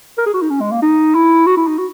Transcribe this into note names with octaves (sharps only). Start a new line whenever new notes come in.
A#4
G#4
F#4
D#4
C#4
G#3
A#3
D#4
E4
F#4
E4
D#4
F#4